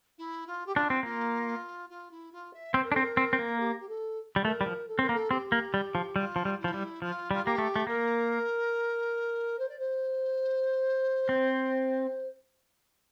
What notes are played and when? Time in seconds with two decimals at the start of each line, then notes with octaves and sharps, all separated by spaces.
0.18 E4
0.46 F4
0.66 G4
0.75 D4 F4
0.90 C4
1.03 A#3 F4
1.89 F4
2.11 E4
2.32 F4
2.53 E5
2.74 C4 C5
2.83 A#4
2.92 D4 A4
2.96 C4
3.01 A#4
3.17 C4
3.33 C4
3.39 A#3
3.60 G4
3.79 G4
3.88 A4
4.36 G3
4.45 A3 A#4
4.61 G3
4.66 F3
4.88 A4
4.99 C4 A#4
5.09 A#3
5.13 A4
5.30 C4 G4
5.52 A#3
5.74 G3
5.95 F3
6.16 G3 F4
6.36 F3
6.45 G3
6.59 E4
6.64 F3
6.74 G3
7.02 F3 F4
7.31 G3 F4
7.44 A#3 G4
7.58 A3
7.76 A3
7.87 A#3 A#4
9.58 C5
9.68 D5
9.79 C5
11.29 C4